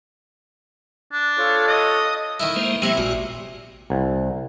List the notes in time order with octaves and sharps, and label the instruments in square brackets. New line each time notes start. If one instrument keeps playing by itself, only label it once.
[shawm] D4
[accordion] F4 A4 C#5
[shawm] D#5
[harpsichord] D#3 D#4 E4
[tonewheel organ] G#3 A#3 C5
[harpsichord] C3 E4 [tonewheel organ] F#3 G#3 A#3
[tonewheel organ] A1 F#4 [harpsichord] A#2
[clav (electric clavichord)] C2